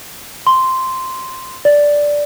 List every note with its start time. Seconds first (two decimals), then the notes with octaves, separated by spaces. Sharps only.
0.47 C6
1.65 D5